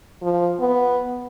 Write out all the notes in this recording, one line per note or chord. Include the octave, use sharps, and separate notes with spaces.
F3
B3